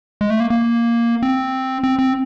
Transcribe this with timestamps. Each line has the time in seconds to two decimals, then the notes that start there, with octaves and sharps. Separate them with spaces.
0.21 G#3
0.30 A3
0.40 A#3
0.50 A#3
1.23 C4
1.83 C4
1.99 C4